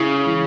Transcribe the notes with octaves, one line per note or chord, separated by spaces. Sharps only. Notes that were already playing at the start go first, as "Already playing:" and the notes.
Already playing: C#3 E4
E3